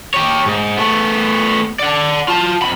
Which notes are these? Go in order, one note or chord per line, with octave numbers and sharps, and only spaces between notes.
G4 C#5
G#2
A3 B3
D5 F#5
F4 A5
F2 B5